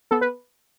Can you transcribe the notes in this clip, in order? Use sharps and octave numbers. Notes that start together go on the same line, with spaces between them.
B3 A4
B4